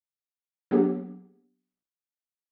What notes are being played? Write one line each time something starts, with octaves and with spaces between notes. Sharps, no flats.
F#3 A#3 B3 D4 G4